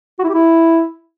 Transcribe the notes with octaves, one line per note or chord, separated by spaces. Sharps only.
F#4
E4
G4
E4